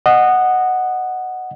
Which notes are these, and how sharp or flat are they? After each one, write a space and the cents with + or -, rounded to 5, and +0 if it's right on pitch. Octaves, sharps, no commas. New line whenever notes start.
D#5 -15 F#5 +0